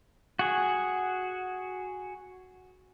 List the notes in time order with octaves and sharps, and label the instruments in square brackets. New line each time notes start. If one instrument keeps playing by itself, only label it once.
[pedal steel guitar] F#4 G#4